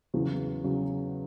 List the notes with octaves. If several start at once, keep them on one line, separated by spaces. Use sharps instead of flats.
E2 C#3 F#3
C#3 F#3